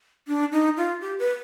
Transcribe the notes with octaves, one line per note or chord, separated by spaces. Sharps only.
D4
D#4
F4
G4
B4